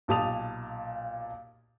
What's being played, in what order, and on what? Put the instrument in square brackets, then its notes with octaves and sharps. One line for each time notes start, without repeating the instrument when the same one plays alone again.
[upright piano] B1 A#2 G4 A5 D#6 F7